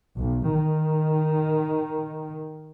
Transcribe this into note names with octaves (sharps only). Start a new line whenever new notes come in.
B1
D#3